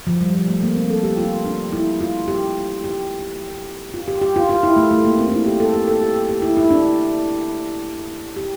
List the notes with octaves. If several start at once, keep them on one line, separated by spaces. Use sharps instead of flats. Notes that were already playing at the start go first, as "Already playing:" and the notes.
F3
G3
F3
A3
A#3
C4
A4
G4
F4
D4
E4
F4
G4
G4
F4
G4
G4
F4
F4
E4
A3
A3
A#3
C4
E4
D4
G4
A4
G4
A4
G4
A4
G4
E4
E4
D4
G4